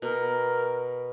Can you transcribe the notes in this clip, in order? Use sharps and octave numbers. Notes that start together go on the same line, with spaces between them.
B2 A#4